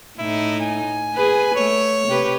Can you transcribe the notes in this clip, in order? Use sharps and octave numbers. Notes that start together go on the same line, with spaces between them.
A2 D#4 E4
G#5
G#4 B4
A3 C#5
C3 G4 B4